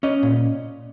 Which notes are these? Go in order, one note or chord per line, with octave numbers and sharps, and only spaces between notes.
C#4 D#5
A#2